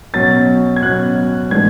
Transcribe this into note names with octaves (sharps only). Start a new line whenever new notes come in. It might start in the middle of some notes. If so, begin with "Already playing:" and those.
B2 F#3 C#4 A6
G#6
B2 F#3 C#4 F#6
A2 E3 G#3 B3 D4 G#6